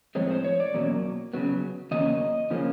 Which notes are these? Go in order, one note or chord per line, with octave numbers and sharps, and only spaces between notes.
A2 F3 G#3 C4 C#5
C5
C#5
D5
E2 B2 F#3 A#3 C#4
C#3 F#3 B3
E2 C#3 F#3 A#3 C#4 D#5
C#3 F3 A#3 C#4